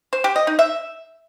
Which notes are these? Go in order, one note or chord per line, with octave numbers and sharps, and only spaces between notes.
C5
G4
D#5
D#4
E5